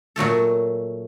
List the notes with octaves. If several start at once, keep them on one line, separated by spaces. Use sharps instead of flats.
A#2 F#3 A3 A4